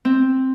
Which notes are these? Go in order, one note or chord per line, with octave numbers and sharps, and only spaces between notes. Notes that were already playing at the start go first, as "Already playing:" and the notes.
C4